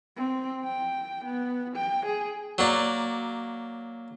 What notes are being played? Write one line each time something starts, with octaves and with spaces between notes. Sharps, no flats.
C4
G5
B3
G5
G#4
F#3 A#3 D5